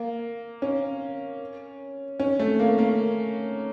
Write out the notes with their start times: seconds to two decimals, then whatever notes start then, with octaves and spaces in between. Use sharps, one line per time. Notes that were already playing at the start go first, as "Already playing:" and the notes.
Already playing: A#3
0.62 C#4
2.20 C#4
2.39 A3
2.59 A#3
2.78 A#3